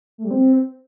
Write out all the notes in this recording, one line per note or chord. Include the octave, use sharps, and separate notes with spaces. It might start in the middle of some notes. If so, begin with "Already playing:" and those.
A3
G3
C4